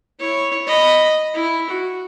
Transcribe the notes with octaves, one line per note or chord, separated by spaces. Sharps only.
E4 C#5
D#5 B5
E4
F#4